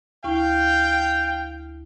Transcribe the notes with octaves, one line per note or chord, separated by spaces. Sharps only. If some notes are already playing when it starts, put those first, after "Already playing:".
D2 E4 F5 G5 C#6